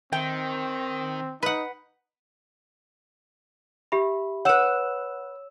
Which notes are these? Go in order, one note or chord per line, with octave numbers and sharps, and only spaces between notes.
D#3 C4 G5
D#4 B4 F#5
G4 E5 B5
B4 C#5 F#5 E6 E7